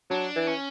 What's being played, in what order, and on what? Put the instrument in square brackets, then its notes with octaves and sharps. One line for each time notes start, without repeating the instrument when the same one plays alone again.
[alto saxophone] F#3 [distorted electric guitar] D4
[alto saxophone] E3
[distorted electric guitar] C#4